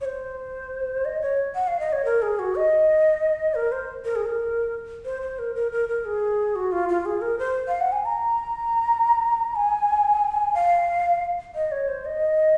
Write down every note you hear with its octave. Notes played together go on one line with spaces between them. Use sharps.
C#5
C5
D#5
C#5
F#5
F5
D#5
C#5
A#4
G#4
F#4
D#5
A#4
C5
A#4
G#4
A#4
C5
C5
A#4
A#4
A#4
A#4
G#4
F#4
F4
F4
G#4
A#4
C5
F5
F#5
G#5
A#5
G#5
F5
D#5
C#5
C5
D#5